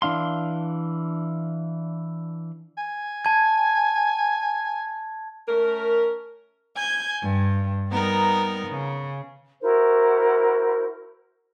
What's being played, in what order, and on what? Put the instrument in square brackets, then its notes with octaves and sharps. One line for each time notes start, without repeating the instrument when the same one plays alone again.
[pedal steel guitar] E3 D4 F5 C6
[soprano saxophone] G#5
[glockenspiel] A5 G#6
[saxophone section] A3 C#4 A#4
[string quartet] G#5 G6 G#6
G2
G3 B3 D#4 A#4
C#3
[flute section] E4 F#4 A#4 C5